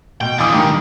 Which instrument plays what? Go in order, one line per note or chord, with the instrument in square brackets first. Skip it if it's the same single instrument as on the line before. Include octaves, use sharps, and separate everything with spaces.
[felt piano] B2 [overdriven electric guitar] G5
[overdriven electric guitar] D3 E3 [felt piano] F5 D6 D#6
[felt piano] G2 [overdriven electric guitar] D#3